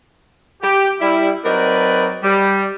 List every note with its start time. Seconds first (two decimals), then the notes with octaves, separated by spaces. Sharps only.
0.62 G4
1.00 G3 E4
1.44 F#3 C4 D#4 A#4 B4 D5
2.23 G3